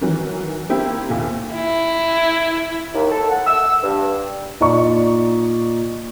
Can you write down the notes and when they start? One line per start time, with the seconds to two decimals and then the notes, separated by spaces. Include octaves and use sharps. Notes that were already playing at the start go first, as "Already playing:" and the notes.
0.01 D#3 E3 F#3
0.69 A#3 C4 E4 G4
1.10 D#2 A#2
1.54 E4
2.94 D#2
3.12 A4
3.29 F#5
3.47 E6
3.83 G2
4.60 A#2 D#4 D5 C#6